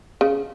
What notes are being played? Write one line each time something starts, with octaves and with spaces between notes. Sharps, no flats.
C#3